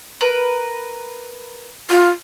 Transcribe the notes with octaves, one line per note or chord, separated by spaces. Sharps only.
A#4 B4
F4